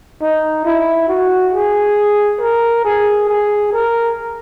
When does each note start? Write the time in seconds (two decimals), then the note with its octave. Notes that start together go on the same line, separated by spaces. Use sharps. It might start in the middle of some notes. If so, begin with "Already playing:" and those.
0.22 D#4
0.65 E4
1.08 F#4
1.53 G#4
2.41 A#4
2.84 G#4
3.29 G#4
3.73 A#4